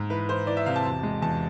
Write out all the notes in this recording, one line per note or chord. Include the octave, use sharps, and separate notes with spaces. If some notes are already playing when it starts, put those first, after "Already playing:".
Already playing: G#2
E3 B4
E3 C5
E3 D5
E5
C3 F5
A5
E1
G#3
E2 A5